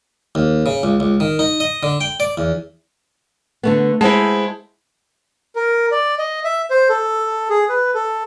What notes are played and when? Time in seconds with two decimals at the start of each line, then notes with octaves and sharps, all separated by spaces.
0.35 D#2
0.66 C#3
0.83 C#2
1.00 C#2
1.20 D#3
1.39 D#4
1.60 D#5
1.83 D3
2.01 G5
2.20 D5
2.37 E2
3.63 D3 A3 B3
4.01 G#3 E4 C5 F#5 A5
5.56 A#4
5.92 D5
6.19 D#5
6.44 E5
6.71 C5
6.89 A4
7.50 G#4
7.69 B4
7.94 A4